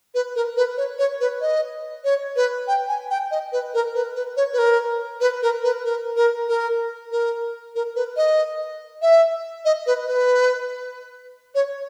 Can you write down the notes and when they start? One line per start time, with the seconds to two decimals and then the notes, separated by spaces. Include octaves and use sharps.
0.15 B4
0.36 A#4
0.57 B4
0.77 C#5
0.99 C#5
1.20 B4
1.41 D#5
2.04 C#5
2.36 B4
2.68 G5
2.88 G#5
3.11 G5
3.31 D#5
3.52 B4
3.74 A#4
3.95 B4
4.16 B4
4.37 C#5
4.53 B4
4.59 A#4
5.21 B4
5.42 A#4
5.64 B4
5.85 A#4
6.16 A#4
6.48 A#4
7.12 A#4
7.75 A#4
7.96 B4
8.17 D#5
9.02 E5
9.65 D#5
9.87 B4
10.07 B4
11.55 C#5